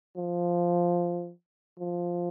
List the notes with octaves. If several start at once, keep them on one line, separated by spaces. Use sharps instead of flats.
F3
F3